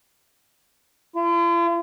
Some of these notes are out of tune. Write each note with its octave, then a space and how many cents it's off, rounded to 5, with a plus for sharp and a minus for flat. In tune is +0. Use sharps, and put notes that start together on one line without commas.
F4 -45